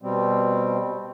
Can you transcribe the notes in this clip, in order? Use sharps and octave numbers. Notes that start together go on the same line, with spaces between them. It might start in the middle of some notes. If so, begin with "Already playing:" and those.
B2 G3 C4